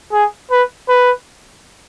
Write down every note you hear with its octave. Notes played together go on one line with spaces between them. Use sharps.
G#4
B4
B4